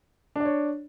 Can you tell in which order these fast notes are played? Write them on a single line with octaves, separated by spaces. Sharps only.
D4 D5 C#5